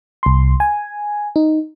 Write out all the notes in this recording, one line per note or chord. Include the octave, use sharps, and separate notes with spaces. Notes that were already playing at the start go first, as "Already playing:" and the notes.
C2 C6
G#5
D#4